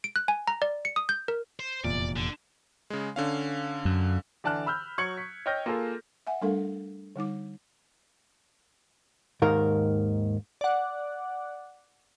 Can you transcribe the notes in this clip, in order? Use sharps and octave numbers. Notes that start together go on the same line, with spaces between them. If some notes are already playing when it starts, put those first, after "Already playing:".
D7
F#6
G#5
A#5
D5
C#7
D#6
G6
A#4
C5
F1 E2 A#2 D5
D3
C#3 G#3
D3 C#4 F5
F#2
D3 E3 D5 A5 F6 F#6
B5 E6 F6 G6
F#3 C#6 G#6 C#7 F#7
B6
C#5 D#5 G5 F6 G6 A#6
A#3 F4 G#4 A4
E5 F#5 G#5
G3 A3 D4 A4 A#4 F5
D3 G3 D#4 D6
D#2 G#2 D#3 A#4 F5
D5 F#5